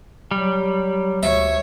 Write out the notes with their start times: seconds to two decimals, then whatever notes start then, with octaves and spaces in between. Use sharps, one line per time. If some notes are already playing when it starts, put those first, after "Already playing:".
0.31 F#3 G3
1.23 D2 C#5 E5